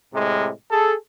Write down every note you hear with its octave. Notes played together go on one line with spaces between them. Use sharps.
A2 C3 G#3
G#4 A4